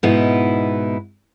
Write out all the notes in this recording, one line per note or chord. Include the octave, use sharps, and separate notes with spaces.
G#2 B2 B3 D#4 E4 B4